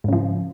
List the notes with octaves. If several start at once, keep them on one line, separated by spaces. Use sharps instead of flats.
G#2 C#3 F3